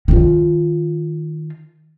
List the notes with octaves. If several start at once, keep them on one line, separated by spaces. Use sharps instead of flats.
D#3 F4